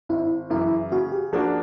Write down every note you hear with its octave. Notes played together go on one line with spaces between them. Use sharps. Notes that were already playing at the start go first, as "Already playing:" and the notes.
G#1 E4
F#2 C#3 E3 E4
C#3 F#4
G4
F3 A#3 D4 F#4 G#4